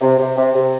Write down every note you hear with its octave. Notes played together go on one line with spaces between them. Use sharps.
C3
C3
C3
C3